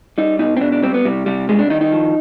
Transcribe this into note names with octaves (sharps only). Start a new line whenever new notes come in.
G3 D#4
B2 D#4
C4
B2 D4
D4
G3 C4
B3
C3 G3
C3 G3
G3 G#3
D4
D#3 D#4
D#4
F3